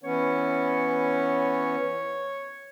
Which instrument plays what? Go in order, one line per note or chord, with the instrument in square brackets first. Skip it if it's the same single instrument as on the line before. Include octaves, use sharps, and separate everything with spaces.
[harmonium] E3 B3 C#4 [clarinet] C#5